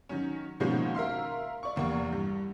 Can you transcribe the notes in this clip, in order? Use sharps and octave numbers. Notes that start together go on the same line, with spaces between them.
D#3 F#3 C#4
B2 D#3 F3 G#3 A#3 C#4
A#4 E5 F5 C6
D5 C#6
F1 E2 A#3 C#6
G2